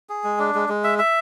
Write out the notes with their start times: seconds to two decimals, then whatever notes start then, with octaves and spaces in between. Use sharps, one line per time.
0.09 G#4
0.24 G#3
0.39 D4
0.55 G#3
0.69 G#3
0.84 E5
0.98 E5